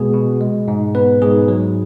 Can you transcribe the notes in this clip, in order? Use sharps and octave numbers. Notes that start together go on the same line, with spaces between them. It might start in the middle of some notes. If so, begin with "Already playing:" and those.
Already playing: B2 G#3 B3 F#4 G#4
B2
G#3
G#2
B3 B4
G#2 G#4
F#3